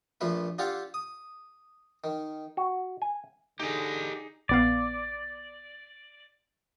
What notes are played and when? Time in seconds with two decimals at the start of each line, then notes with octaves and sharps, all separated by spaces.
0.21 A#1 A#2 F3 A3 B4
0.58 D4 F4 G4 A4 F5 F#5
0.94 D#6
2.04 D#3
2.57 F#4
3.02 G#5
3.60 D3 D#4 G4 G#4 D#5
4.49 A#1 B3 D5 F5